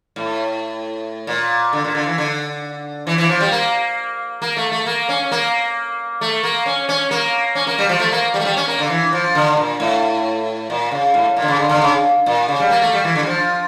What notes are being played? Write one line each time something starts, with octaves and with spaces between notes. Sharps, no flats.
A2
A#2
D3
A#2
D3
E3
D3
E3
E3
F3
G3
A#3
A#3
A3
A3
A#3
C#4
A#3
A3
A#3
C#4
C#4
A#3
C#4
A#3
G3
F3
A3
A#3
G3
A3
G3
C#4
A#3
D3
E3
F3
D3
A#2
A2
A#2
C#3
A2
A#2
D3
C#3
D3
D3
C#3
A#2
C#3
G3
A#3
A3
G3
E3
D3
G3
F3